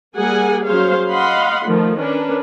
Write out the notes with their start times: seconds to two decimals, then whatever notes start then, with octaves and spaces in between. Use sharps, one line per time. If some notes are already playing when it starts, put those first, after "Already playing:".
0.17 G3 A#3 G#4 A#4 F#5 G#5
0.66 F#3 C#4 G#4 C5 C#5 F5
1.08 D#5 F5 F#5 B5 C6
1.66 D#3 F3 A3
1.99 C#4 D4 A#4 B4